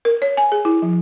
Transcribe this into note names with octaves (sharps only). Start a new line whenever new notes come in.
A#4
C#5
G#5
G#4
E4
F3